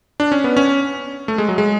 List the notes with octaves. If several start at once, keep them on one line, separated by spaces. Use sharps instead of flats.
D4
C#4
B3
C#4
A3
G#3
F#3
G#3